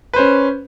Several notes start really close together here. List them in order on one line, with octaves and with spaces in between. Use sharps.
B4 C5 C#4